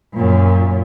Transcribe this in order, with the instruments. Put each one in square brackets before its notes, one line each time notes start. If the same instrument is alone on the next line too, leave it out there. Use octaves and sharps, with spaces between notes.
[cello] F#2 A#2